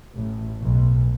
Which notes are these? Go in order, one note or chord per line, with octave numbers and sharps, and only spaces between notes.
A1
B1